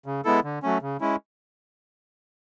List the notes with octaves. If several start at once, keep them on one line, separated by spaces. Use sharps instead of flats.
C#3
G#3 B3 E4 A4
D3
F#3 A3 C#4
C#3
G#3 C#4 E4